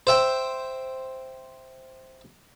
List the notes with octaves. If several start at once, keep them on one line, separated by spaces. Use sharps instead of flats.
C5 E5 G5